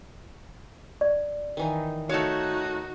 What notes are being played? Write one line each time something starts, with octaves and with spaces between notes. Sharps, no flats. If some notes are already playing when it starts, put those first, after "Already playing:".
D5
D#3 E3 D#4
A3 D#4 F#4 C#5 F5 A5